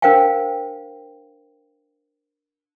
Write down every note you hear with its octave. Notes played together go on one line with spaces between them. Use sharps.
D4 A#4 C5 F5 G5 G#5